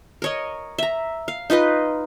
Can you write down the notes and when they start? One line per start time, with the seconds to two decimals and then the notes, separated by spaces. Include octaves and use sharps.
0.22 A#4 C#5 D#5
0.78 E5 A#5
1.28 F5
1.50 D#4 F4 B4 D#5